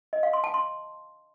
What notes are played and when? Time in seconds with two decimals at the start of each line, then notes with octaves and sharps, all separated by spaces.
0.13 D#5
0.23 F5
0.33 C6
0.44 A5
0.54 C6